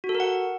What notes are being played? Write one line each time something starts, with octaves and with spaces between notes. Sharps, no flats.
F#4
A4
A#4
F#5